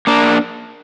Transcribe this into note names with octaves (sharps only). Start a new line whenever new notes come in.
A#3 D4